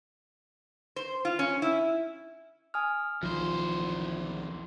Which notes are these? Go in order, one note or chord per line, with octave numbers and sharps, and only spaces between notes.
C5
F4
C#4
E4
G#5 D#6 F6
B1 E2 D#3 F3 F4 C5